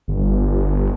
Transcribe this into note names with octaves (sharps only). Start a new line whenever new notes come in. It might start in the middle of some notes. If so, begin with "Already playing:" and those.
G1